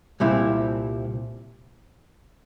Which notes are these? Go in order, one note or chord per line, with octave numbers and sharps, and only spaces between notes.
C2 A#2 G3 C4 E4